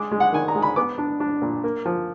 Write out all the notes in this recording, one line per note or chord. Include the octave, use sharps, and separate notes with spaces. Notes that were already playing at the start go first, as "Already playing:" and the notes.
Already playing: G#3 D6
G#3
F#5
D#3 G#5
A#5
G#3
B5
B3 D6
D4
D4
A#2
A#3
F3